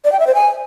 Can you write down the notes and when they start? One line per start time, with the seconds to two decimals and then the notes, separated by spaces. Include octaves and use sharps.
0.05 D5
0.12 G5
0.20 E5
0.27 C5
0.35 G#5